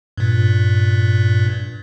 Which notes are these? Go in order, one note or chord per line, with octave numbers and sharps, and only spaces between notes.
G2 A#2